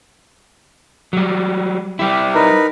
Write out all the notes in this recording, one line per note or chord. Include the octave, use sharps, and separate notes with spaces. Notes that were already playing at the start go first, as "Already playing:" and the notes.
F#3 G3
G3 E4 G4
D#4 A#4 B4